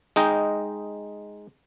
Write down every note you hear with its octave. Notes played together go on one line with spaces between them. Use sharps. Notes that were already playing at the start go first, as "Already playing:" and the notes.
G#3 D#4 D#5 G5